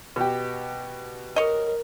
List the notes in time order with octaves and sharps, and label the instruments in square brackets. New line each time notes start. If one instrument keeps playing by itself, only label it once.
[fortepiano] B2 G4
[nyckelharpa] A#4 [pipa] C#5 D#5